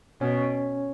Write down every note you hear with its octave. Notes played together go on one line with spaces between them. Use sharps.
B2 C#4 C#5